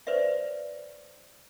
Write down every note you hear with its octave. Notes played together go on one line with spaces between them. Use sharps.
B4 C5 D5 E5